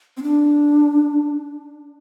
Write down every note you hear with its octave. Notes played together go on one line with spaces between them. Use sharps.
C4
D4